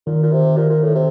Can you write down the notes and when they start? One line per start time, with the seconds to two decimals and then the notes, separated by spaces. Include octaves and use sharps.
0.06 A#2 D#3
0.23 A#2
0.32 C3
0.57 A#2
0.70 A#2
0.82 A2
0.95 C3